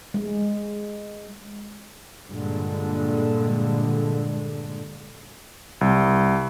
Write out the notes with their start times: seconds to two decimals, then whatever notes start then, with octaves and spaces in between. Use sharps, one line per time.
0.14 G#3
2.30 G2 A#2 D3 G#3
5.81 C2